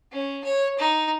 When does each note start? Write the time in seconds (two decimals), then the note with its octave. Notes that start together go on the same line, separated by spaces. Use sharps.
0.12 C#4
0.44 C#5
0.78 D#4